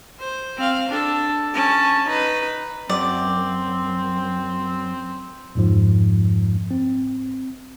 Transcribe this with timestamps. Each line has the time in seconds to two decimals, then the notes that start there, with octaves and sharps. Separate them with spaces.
0.19 C5
0.58 C4 F5
0.89 D4 A4
1.54 C#4 A5
2.08 D#4 B4
2.90 F#2 C4 D5
5.55 F2 G#2 F3
6.71 C4